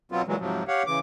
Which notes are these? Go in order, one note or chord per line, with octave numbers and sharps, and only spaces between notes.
B2 F#3 B3 C4 F4
A#2 E3 F#3 G#3
G#2 C3 F3 F#3
G4 C#5 F5 F#5
C#3 E3 D6